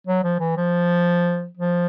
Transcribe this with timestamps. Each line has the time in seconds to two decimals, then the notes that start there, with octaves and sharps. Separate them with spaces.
0.07 F#3
0.24 F3
0.39 E3
0.57 F3
1.57 F3